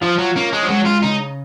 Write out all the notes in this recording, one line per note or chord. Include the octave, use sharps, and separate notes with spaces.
F3 F4
F#3
A#3 C#4
G#3
F3
F#3 G#3
F4
C#3 D#4